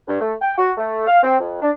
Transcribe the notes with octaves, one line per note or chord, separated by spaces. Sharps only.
G2
A3
G5
F#4
A3
F5
C4
F2
D4